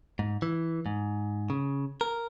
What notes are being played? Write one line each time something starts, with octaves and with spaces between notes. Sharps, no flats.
G#2
E3
G#2
C#3
A#4